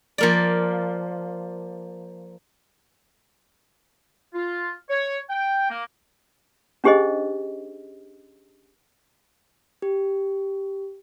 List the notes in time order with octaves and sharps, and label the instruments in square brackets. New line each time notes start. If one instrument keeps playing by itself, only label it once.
[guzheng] F3 A#3 D5
[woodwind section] F4
C#5
G5
A#3
[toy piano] C#4 D4 G4 G#4 C5 D#5
[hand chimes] G4